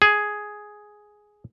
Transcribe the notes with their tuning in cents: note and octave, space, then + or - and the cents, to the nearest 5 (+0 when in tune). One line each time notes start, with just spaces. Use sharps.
G#4 +5